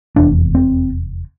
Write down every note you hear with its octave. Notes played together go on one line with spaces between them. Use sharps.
F1 E2 C3 D4
C4